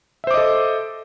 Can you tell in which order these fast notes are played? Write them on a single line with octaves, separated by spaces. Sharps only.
E5 C5 D6 D#5 A4